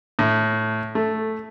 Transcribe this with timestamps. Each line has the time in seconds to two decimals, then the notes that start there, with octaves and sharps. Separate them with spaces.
0.19 A2
0.95 A3